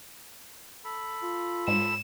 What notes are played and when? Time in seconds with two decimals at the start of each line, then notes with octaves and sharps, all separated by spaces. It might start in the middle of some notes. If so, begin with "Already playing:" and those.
0.84 A4 B5
1.23 F4
1.68 G#2 E7